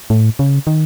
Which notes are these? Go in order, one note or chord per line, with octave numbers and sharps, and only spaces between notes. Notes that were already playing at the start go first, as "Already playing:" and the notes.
A2
C#3
D#3